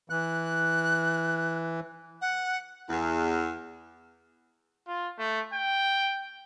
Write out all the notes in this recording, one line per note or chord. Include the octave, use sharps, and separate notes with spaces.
E3 F#6
F#5
E2
F4
A3
G5